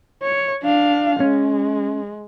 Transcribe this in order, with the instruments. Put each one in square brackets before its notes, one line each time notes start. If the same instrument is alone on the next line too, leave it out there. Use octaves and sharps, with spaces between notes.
[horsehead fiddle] C#5
D4 F5
[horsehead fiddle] G#3 [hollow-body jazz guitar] C#4